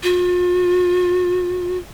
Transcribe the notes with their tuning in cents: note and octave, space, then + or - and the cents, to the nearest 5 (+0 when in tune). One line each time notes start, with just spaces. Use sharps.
F4 +45